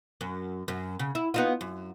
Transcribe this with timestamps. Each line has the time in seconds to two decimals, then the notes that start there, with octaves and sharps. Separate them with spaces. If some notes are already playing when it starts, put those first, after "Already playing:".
0.21 F#2
0.68 F#2
0.99 C#3
1.15 E4
1.34 B3 D#4 F4
1.61 F#2